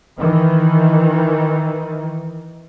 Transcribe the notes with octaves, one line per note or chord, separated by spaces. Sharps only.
D#3 E3